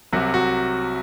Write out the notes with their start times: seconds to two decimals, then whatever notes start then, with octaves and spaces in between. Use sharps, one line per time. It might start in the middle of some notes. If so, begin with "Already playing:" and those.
0.12 C2 C3 F#3 F#4
0.34 F#4